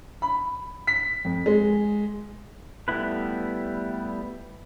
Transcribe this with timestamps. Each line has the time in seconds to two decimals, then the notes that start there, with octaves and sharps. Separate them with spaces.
0.22 B5
0.87 B6
1.25 F2
1.46 G#3
2.88 G3 A3 B3 E4 B4